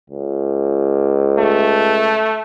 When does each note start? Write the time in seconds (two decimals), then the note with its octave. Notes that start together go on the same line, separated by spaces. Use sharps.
0.10 C#2
1.38 A3